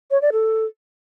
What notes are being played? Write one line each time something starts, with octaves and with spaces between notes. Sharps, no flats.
C#5
D5
A4